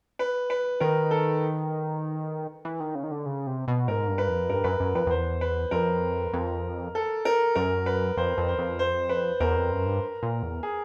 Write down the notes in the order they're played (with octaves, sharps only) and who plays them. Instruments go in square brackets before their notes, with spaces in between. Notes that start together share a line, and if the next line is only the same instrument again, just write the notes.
[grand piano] B4
B4
[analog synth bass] D#3 [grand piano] A#4
[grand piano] A4
[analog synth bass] E3
D#3
C#3
D#3
D3
C#3
C3
B2
[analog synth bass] G#2 [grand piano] A#4
[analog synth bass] G2
[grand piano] B4
[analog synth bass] F2
[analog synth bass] G2 [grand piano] A#4
[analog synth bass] F#2 [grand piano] B4
[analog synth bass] F#2
[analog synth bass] F2 [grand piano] B4
[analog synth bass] F2
[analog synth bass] E2 [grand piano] C5
[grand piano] B4
[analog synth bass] F2 [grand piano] A#4
[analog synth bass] F2
[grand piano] A4
A#4
[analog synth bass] F#2 [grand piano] A#4
[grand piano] B4
[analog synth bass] F2 [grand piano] C5
[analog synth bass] F2
[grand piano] C5
[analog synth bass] F2
[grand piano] C5
B4
[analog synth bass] E2 [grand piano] A#4
[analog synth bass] F2
F#2
G2
A#2
E2
[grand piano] G#4